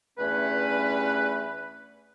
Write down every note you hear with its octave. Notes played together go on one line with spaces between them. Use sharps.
E2 G2 A3 C#4 B4